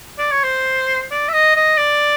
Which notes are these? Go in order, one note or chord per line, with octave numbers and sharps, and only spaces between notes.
D5
C#5
C5
D5
E5
D#5
D#5
D5